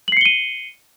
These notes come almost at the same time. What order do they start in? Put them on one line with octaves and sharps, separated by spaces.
F#7 C7 C#7 G7 D#7